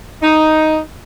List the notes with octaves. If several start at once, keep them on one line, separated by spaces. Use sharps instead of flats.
D#4